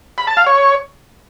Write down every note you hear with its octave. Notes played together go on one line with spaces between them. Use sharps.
B5
A5
F5
C#5